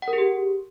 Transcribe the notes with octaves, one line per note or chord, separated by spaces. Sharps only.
F#5
A#4
G#4
G4